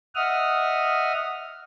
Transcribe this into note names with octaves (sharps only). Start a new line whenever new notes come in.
D#5 E5 F#5 D#6 F6